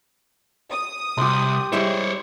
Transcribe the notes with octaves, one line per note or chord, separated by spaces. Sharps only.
D#6
C2 G4 C6
G3 G#3 E4 C5 C#5